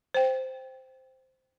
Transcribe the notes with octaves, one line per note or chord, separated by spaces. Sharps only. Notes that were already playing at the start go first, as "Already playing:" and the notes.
C5 G5